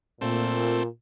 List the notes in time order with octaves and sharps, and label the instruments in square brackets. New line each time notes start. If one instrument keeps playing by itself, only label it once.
[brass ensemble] A#2 [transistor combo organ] A3 C4